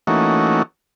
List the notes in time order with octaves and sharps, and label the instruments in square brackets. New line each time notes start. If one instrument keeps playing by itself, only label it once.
[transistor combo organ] E3 A3 A#3 C#4 D#4 F#4